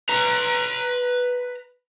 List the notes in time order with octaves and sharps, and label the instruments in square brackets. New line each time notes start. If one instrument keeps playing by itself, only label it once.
[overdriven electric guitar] B4 A#5